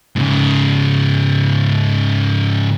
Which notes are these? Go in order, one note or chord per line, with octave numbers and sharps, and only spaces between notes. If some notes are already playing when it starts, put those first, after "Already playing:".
G#2 C#3